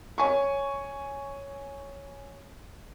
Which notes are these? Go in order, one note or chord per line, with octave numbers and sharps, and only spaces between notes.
C#5 G#5 C#6